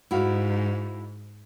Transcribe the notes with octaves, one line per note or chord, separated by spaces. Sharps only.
G#2 E4 F#4 F5